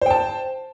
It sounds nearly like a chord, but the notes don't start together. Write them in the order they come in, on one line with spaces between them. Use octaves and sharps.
C5 G5 A5